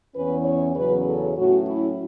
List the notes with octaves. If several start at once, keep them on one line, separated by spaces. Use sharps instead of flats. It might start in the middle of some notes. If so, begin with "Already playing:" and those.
E2 E3 C#4 B4
C#5
E2 C#3 F#3 C#4 B4
A4
A2 F#3 C#4 F#4
E4